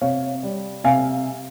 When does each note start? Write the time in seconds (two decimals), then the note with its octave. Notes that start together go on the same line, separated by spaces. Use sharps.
0.01 C3 C#5 F5
0.43 G3
0.84 C3 F5 G#5